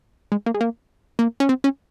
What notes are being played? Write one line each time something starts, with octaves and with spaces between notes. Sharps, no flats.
G#3
A#3
G#3
A#3
A#3
C#4
C4
C#4